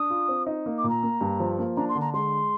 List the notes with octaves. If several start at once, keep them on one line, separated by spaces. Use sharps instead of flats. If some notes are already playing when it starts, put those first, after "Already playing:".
Already playing: D4 D#6
F4
C4
D#4
A#3
D6
A#2
A#5
A#3
G2
F3
A#3
D4 A#5
C6
D3
A#5
G#3 C6